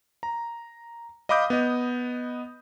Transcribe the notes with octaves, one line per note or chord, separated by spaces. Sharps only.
A#5
D#5 F5 B5 D6 D#6 G6
B3 D#5